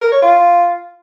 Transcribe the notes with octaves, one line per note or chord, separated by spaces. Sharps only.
A#4
C#5
F4